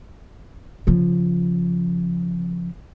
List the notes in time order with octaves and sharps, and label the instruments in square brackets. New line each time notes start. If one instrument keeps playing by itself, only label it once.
[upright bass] C#3 F3